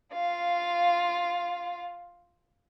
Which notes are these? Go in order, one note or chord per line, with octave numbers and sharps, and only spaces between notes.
F4 F5